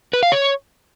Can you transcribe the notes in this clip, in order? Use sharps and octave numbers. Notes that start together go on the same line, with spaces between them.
B4
F5
C#5